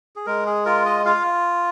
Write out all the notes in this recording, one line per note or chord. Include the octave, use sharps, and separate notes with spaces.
G#4
G#3 A#4
G#4
F4 A#4
D#5
F4 F5